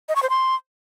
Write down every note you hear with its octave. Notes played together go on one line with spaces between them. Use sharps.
D#5
C#6
C5
C6